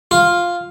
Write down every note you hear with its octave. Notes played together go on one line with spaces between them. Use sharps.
F4